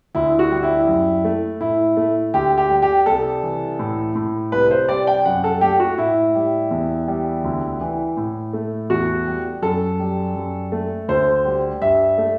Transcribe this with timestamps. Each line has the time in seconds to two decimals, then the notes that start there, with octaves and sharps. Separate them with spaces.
0.15 D2 E4
0.39 F#4
0.51 G3
0.63 E4
0.88 F#2
1.24 A3
1.61 A2 E4
1.97 A3
2.34 D2 G4
2.58 G4
2.70 G3
2.82 G4
3.06 C2 A4
3.43 E3
3.79 A2
4.16 A2
4.52 C2 B4
4.71 C5
4.89 G3 D5
5.07 G5
5.25 F#2 F#5
5.44 A4
5.61 A3 G4
5.80 F#4
5.98 A2 E4
6.35 G3
6.71 E2
7.08 G3
7.44 D2
7.81 E3
8.17 A2
8.53 A3
8.90 E2 F#4
9.27 G3
9.62 F#2 A4
9.99 G3
10.36 F#2
10.72 A3
11.08 D2 C5
11.45 G3
11.82 G2 E5
12.18 A3